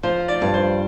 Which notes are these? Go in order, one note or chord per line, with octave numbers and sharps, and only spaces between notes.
F3 C5
D5
G2
C5